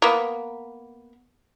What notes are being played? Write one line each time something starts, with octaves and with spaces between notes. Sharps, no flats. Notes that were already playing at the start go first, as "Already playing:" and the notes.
A#3 B3